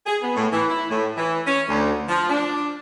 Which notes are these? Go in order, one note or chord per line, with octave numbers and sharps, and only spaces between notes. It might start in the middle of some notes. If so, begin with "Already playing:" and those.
G#4
B3
A2
E3
E4
A2
E3
C#4
D2
F3
D4